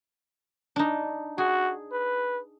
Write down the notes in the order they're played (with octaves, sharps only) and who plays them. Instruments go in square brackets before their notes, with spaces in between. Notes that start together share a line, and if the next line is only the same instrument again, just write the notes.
[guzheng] D4 D#4
[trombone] F#4 [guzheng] G#4
[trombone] B4